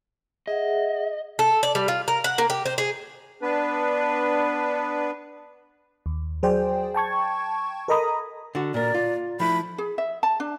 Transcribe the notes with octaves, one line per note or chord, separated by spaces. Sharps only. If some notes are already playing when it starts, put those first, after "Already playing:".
G#4 D#5 E5 F#5
A4
D5
G3
F4
A#4
F#5
A#3
G4
C5
G#4
B3 D4 B4
D#2
F#3 G#4 C5 D5 G5
G5 A5 C#6 G#6
A4 A#4 D#5 A#5 B5 D#6
D3 F#4
A#2 A#4 D5
F4
F3 A3 E4 B5
G#4
E5
A5
D4